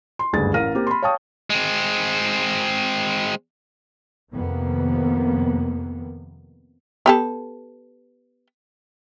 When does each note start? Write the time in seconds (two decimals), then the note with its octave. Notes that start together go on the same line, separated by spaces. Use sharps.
0.19 C6
0.33 F#1 D2 G2 G#4 A6
0.54 A1 A#4 F5 F6 A#6 D#7
0.75 A#3 C4 G4
0.87 B5 C6
1.02 C#5 F5 G5 A5 C#6 D#6
1.50 G#3 C4
4.32 F2 C3 D#3 A#3 B3
7.06 B3 G4 A4